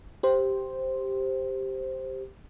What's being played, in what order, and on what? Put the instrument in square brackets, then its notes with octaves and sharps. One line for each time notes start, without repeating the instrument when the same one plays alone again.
[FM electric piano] G4 C5